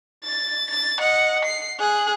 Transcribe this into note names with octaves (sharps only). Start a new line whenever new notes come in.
A6
A6
D#5 F#5
C7
G#4 F#6